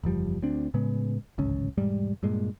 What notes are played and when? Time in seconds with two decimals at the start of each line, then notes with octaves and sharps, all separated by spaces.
0.04 F#1 E2 F3 G3
0.42 D2 C4 D4
0.74 A2 C#3 G#3 B3
1.38 D1 G#1 C#2 C#4
1.78 E1 G#2 G3
2.23 G2 A#2 G#3